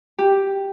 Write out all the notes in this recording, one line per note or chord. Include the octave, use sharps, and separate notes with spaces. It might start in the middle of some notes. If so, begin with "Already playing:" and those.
G4